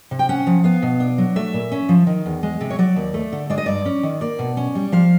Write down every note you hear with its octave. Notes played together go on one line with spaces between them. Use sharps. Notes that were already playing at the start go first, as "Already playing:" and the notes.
C3
G5
C#4 F#5
F3
B3 F5
B2
D4
F#3
A3 E5
A#2
C#4
F3
D#3
E2
G#3
C3
C#5
F#3 D5
D#2
A3
D3
G#3 D5
D#5
G2 D5
C#4
D#3
A#3 D5
B2
C#4
G3
F3 F5